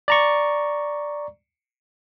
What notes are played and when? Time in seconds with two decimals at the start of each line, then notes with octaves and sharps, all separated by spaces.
0.08 D5 A#5 C#6